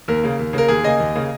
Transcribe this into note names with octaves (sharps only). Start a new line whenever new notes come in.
D#2 A#4
C#3 A#3
D#2
C#3 A#3 A#4
D#2 G#4
C#3 A#3 D#5 G#5
D#2
C#3 A#3